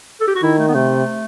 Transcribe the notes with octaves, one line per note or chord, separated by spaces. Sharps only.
A4
G4
F#4
D#3 E4
A3
B3
C3 A3